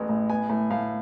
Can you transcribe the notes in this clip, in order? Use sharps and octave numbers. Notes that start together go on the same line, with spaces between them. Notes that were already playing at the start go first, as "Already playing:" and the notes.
Already playing: A1 G#3 B3
A2
B3 G#5
A2
A2 F5